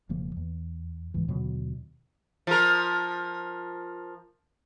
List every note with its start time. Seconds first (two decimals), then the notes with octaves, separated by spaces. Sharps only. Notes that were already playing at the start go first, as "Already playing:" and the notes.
0.09 E1 C#3 F3 A#3
0.37 E2
1.14 C#2 G#2 E3
1.28 D#2 B2 D3 F#3
2.47 F3 A#4